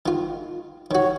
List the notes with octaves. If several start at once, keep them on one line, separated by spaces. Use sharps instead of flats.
D#3 F4
D#3 F#4 C#5